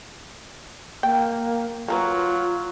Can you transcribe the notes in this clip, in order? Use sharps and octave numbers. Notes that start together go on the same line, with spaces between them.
A#3 G5
F#3 A#3 F4 A#4 B4